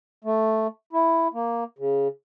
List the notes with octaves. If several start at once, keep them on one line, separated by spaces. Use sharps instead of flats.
A3
E4
A#3
C#3